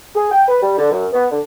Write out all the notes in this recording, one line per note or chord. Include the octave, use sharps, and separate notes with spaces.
G#4
G5
B4
G3
D3
F#2
B3
D3